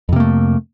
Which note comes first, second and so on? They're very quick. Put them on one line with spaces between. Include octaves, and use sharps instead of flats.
F2 C3 A#3 A3